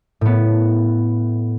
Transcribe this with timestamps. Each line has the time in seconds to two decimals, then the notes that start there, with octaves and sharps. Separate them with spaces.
0.21 A2 B3